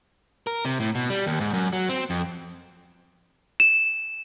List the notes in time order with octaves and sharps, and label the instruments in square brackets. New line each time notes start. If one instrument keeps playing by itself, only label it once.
[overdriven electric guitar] A#4
C3
A2
B2
G3
D#2
G#2
F#2
F#3
C4
F2
[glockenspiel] E7